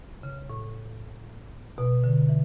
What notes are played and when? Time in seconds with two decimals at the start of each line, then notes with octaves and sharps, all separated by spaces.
0.23 C#3
0.50 A2
1.78 B2
2.04 D3
2.29 E3